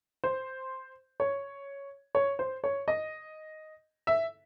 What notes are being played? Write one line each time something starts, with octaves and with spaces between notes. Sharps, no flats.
C5
C#5
C#5
C5
C#5
D#5
E5